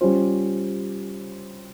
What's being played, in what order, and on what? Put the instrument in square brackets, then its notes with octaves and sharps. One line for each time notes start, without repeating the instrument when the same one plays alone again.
[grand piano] G3 C#4 F4 C5